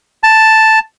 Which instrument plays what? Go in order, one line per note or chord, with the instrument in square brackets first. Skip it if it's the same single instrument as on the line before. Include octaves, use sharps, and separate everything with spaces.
[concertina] A5